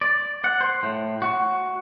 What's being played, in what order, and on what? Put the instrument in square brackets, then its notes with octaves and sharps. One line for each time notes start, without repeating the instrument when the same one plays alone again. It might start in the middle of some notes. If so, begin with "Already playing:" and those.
[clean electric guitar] D5
F#5
C5
A2
F#4